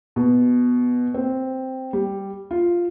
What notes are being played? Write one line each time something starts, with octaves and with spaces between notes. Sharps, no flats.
B2
C4
G3
F4